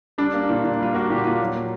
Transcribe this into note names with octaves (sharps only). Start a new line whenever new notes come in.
G3 D4
A#3
A#2
A#2
G3 F4
A#3 F#4
A#2 G4
A#2 F4
F#3
A#3